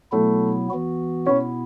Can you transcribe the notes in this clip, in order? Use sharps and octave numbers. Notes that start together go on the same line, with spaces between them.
B2 F#3 A3 B3 E4
E3 B3 F#4
B2 B3 C#4 E4